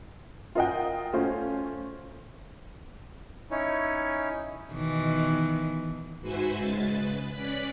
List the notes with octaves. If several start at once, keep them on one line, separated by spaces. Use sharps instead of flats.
F4 A#4 D#5 F#5 G5
A3 C#4 F4 C5
C#4 D#4 E4 C#5
B2 D#3 E3
G#2 F#4 B4 C5 E5 G#5
C#3 G#3 A6
B4
C#4 D5 F#6 B6